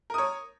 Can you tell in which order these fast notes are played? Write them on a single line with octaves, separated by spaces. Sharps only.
A#4 D#6 C#5